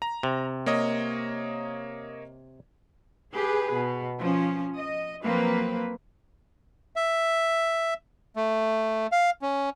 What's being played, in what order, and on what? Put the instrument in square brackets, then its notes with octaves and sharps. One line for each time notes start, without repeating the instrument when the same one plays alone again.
[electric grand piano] A#5
[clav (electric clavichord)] C3
[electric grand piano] A#3 C#5 D#5
[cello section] G4 G#4 B4
B2
F3 C#4
D#5
F3 F#3 A#3 C4 B4
[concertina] E5
A3
F5
C#4